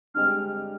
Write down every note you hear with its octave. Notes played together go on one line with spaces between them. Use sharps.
G2 D3 G#3 C4 G4 F6